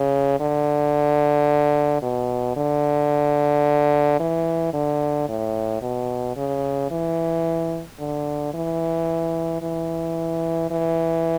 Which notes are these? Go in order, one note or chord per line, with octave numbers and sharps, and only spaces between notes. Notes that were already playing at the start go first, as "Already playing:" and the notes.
Already playing: C#3
D3
B2
D3
E3
D3
A2
B2
C#3
E3
D3
E3
E3
E3